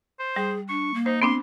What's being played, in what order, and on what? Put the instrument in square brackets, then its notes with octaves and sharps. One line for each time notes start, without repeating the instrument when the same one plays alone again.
[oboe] C5
[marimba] G3 [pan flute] G#4
[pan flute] D4 [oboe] C#6
[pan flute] A#3
[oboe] D#4 [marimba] C5
[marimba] B3 C4 D4 [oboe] C6